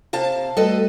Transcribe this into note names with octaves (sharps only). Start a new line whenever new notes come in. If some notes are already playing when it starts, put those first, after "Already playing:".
C3 F5 A5
G3 A3 F#4 A4 B4 D#5